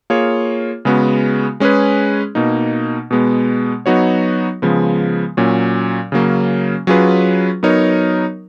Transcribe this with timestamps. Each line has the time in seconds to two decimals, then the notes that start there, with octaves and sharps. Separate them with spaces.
0.10 A#3 F4 G#4 C#5
0.85 C#3 G#3 B3 F#4
1.60 G#3 C#4 G#4 B4
2.35 B2 A#3 D#4
3.11 B2 G#3 B3
3.86 F#3 B3 D#4 F#4 C#5
4.62 C#3 F3 G#3 B3
5.37 A#2 F#3 C#4
6.12 C#3 F#3 A#3 C#4
6.87 F#3 C#4 F4 G#4 B4
7.63 F#3 B3 D#4 A#4 C#5